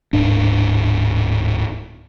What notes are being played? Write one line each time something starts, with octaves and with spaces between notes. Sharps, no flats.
D1 G#2 D4